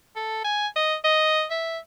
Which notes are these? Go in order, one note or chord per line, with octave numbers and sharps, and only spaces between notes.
A4
G#5
D#5
D#5
E5